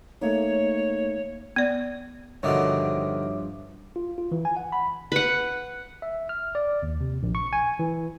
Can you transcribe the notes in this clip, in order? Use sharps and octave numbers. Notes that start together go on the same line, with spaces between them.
A3 A#3 D#4 C#5
B3 D5
G2 B2 D3 D#3 F3 C#5 E5 D6
F4
F4
E3
G#5
F#5
B5
B4 F#5
E5
F6
D5
D#2
C3
A#1
C#6
G#5
E3